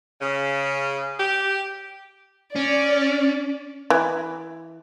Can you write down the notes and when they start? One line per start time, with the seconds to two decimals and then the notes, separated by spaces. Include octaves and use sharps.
0.20 C#3
1.18 G4
2.56 C#4 D5
3.90 E3